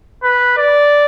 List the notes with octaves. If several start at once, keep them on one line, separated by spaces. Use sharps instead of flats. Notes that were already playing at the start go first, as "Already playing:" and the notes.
B4
D5